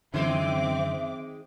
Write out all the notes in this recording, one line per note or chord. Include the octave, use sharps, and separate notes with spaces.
F#2 D3 D#3 G#3 C4 C5 E5 D6